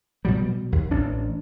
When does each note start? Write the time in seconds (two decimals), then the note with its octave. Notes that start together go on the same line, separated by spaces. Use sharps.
0.25 B2 F#3 G3
0.72 D#2
0.91 A1 D4